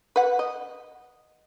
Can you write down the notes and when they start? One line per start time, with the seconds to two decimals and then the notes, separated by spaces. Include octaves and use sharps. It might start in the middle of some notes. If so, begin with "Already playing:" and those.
0.16 B4 F#5
0.39 D#5